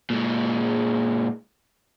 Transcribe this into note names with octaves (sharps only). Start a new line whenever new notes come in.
A#2 G#3